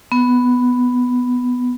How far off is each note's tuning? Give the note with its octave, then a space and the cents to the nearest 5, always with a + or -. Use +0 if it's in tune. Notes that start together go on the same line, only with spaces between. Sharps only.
B3 +5